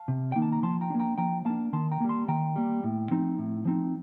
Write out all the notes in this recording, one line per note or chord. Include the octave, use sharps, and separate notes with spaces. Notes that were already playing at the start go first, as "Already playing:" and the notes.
Already playing: F5 A5
C3
D#3 A#3 D#4 G5
A5
A#5
F3 A5 C6
G5 A#5
A#3 D4
G5 A#5
F3 G5 A#5
A#3 D4 F5 A5
D#3 A5 C6
G5 A#5
G3 A#3
A5 C6
D#3 G5 A#5
G3 A#3
A2
F3 C4 D#4
A2
F3 C4 D#4